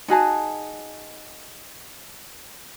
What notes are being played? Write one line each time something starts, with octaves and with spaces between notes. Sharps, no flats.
D#4 F#4 G#4 A5